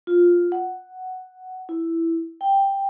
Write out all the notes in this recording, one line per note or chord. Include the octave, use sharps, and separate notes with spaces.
F4
F#5
E4
G5